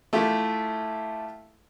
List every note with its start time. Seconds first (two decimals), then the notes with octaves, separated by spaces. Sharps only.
0.13 A3 E4 F4 G4